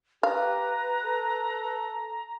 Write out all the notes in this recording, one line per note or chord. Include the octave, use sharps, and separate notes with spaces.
G4 B4 F5 A#5
A4